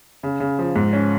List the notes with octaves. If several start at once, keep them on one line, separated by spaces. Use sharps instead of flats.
C#3
C#3
F3
G#2
C#4